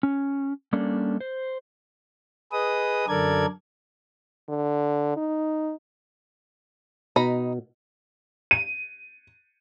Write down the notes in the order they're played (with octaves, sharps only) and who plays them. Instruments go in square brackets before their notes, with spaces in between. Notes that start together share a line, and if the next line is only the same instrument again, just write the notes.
[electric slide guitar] C#4
G3 A#3 C#4 D4 A4 D5
C5
[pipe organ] G#4 B4 D#5 D#6
F#2 D3 A4 A#4 D5 G#6
[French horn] D3
D#4
[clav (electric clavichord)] B2 [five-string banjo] D#4 A#5 B5
[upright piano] D#7